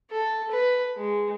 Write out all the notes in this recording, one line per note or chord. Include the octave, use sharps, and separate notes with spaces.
A4
B4
G#3